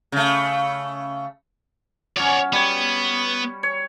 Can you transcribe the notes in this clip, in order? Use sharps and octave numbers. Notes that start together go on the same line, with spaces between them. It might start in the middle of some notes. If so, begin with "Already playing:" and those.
C#3 A3
F#3 C#4 C#5 D5
G3 B3 C#5
C#5